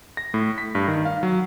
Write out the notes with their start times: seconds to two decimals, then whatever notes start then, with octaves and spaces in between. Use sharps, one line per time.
0.17 A#6
0.34 A2
0.58 B6
0.75 G2
0.88 D#3
1.05 F5
1.23 F#3